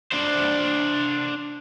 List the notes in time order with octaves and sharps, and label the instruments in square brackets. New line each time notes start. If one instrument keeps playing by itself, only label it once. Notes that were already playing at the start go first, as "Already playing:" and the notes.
[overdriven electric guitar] D4 C5